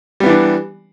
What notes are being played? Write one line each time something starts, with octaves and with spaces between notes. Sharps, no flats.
E3 G3 B3 D4